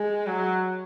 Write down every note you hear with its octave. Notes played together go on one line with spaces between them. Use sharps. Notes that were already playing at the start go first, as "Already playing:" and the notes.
Already playing: G#3
F#3